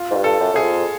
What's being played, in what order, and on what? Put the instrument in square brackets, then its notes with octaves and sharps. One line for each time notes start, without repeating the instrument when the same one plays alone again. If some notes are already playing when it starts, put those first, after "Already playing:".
Already playing: [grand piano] F4
[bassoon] G#2
G2
[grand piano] A4
[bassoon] F#2
[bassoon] F#2 [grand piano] G#4
[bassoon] F2